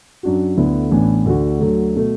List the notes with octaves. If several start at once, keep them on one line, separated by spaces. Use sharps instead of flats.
F#2 F#3 D4 F#4
D2 D3 B3 E4
A1 A2 E3 B3 D4
D2 D3 A3 F#4
D2 D3 F#3 A3
B2 A3